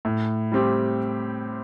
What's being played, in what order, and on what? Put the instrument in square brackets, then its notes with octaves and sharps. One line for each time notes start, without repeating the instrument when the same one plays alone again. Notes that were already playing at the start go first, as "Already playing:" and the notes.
[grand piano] A2
G3 C4 G4